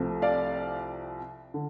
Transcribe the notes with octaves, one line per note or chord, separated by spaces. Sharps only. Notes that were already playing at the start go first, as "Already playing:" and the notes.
Already playing: C2 C3 F3 A3
D5 F5
D3